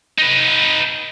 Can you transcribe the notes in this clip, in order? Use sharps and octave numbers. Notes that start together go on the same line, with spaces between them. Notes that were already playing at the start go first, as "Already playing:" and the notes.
D#4 B4